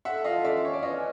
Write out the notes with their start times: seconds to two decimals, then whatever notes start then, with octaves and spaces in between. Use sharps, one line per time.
0.05 A4 E5 F#5
0.24 F4 D#5 F5
0.45 C#4 D5 E5
0.63 C#4 C#5
0.74 D5
0.83 B4 C#5 D#5